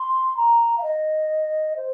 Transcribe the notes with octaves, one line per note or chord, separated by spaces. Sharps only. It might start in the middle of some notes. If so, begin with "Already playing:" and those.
Already playing: C6
A#5
F5
D#5
C5